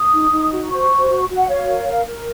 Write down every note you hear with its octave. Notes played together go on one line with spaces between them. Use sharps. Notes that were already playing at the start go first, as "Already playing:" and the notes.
Already playing: D#6
D#4
D#4
F#4
C5 C#6
F#4
F#4
F#4
F#5
C#5 F5
A#4
A#4
A#4